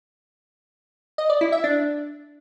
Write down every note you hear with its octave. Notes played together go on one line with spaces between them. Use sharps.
D#5
D5
E4
E5
D4